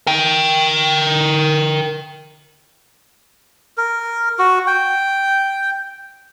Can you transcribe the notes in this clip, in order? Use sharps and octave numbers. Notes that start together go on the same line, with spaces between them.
A#4 G5
A#4
F#4
G5